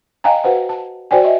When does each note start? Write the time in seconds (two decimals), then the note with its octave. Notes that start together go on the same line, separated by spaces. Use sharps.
0.24 D#5 F5 G5 G#5 A#5
0.44 F#4 B4 C5 F#5
0.69 A5
1.11 F#4 C5 D5 G5 G#5
1.24 D#5 E5